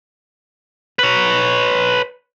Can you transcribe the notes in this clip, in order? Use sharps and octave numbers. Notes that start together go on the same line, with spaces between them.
B4 C#5